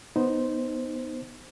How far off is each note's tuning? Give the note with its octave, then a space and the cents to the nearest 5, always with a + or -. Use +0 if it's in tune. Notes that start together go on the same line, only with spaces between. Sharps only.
B3 +0 D#4 +0 C5 +0